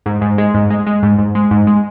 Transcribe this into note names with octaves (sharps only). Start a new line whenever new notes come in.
G#2
G#2
G#3
G#2
G#3
G#3
G#2
G#2
G#3
G#2
G#3